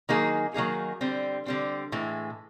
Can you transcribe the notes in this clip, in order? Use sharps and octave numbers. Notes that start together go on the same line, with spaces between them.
D#3 F#3 A#3 D#4 G#4
D#3 F#3 A#3 D#4 G#4
D3 G3 C4
D3 G3 C4
A2 E3 G#3